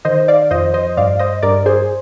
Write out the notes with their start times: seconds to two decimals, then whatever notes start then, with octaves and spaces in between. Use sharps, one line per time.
0.05 D#3 C5 D#5
0.28 D5 F5
0.51 F2 C5 D#5
0.74 C5 D#5
0.97 G2 D5 F5
1.19 C5 D#5
1.43 G2 A#4 D5
1.66 G#4 C5